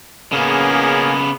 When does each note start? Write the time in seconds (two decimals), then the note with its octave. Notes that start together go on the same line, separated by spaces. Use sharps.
0.32 C#3 A#3 B3 C#4 G#4